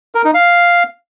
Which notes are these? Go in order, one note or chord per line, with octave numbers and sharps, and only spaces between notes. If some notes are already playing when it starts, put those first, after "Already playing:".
A#4
D#4
F5